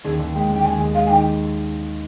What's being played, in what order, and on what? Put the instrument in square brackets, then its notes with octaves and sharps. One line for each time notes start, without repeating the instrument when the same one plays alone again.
[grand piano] D#2 [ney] G#4
[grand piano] D#2
[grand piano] G#3 [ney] G5
[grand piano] D#2 [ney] G5
[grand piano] D#2 [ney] G#5
[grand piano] G#3
[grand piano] G#3 [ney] F5
[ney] G#5
[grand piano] D#3 [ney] G5